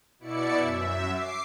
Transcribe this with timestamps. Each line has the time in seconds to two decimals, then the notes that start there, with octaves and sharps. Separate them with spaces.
0.19 B2 E4 D5 C#7
0.58 F#2 E5
1.11 D6 C7